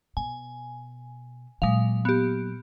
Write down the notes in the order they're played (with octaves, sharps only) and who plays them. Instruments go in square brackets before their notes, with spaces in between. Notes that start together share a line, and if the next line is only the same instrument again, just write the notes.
[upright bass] B2 [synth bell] G#5
[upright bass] A#2 F#3 [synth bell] G#3 F5
[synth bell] B3 G4